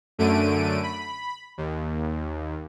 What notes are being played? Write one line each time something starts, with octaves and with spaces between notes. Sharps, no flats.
F#2 D3 A3 D7 D#7
B5
D#2